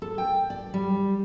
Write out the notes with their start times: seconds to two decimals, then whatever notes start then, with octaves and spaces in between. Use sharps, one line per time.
0.02 A4
0.18 G5
0.50 D5
0.74 G3